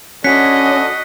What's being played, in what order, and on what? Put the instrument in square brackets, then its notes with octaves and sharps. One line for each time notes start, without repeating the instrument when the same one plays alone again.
[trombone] D3 [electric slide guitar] C#4 [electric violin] F#4 D#5 [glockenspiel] F#6 B6 C#7